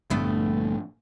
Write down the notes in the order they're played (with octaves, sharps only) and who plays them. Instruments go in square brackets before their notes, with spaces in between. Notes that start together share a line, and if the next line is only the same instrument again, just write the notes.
[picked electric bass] A#1 D3 [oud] G2 A3 B3